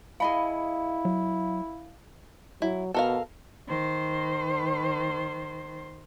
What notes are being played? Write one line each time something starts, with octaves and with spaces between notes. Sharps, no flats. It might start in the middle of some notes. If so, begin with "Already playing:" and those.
E4 G#4 D#5 F5 B5
F#3
F#3 E4
B2 A4 A#4 F5
D#3 C5